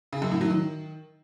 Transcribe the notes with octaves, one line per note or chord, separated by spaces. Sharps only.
C#3
F#2
A2
F#3
D#3